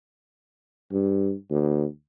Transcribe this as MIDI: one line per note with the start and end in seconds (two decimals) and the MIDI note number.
0.92 1.33 43
1.50 1.84 38